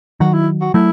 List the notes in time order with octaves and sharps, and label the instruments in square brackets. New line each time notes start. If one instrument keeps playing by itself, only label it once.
[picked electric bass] D#3 F#3 [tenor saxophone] F#4
[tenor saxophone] E4
F#4
[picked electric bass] F#3 A3 [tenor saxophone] E4